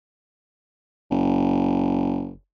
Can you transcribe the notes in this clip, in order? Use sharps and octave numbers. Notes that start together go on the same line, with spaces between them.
F#1